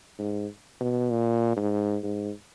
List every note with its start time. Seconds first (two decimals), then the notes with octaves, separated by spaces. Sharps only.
0.19 G#2
0.81 B2
1.10 A#2
1.57 G#2
2.03 G#2